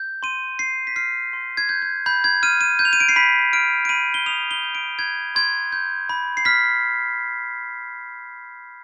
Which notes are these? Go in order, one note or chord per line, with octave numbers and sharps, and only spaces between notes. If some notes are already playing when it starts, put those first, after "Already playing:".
Already playing: G6
C6 D#7
C6 C7
B6
F6 C7
C6
G#6
G6
G#6
B5 G6
G#6
F6 D#7
D#7
G6
F7
D#7
D7
C7
B5 B6
F6 D7
D7
B5 D#7
G7
D#6 F7
G7
G6
D7
G6 G#6
C6 G#6
G6
B5
C7
F6 B6